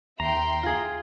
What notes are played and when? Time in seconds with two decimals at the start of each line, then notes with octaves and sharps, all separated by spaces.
0.20 D#2 E5 G5 A#5 C6
0.63 F4 G#4